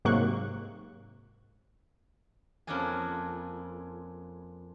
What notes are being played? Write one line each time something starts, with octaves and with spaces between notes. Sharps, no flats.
G#2 C3 F#3 A#3 C#6 F#6
F2 A#3 C#4 D4 A4 G#5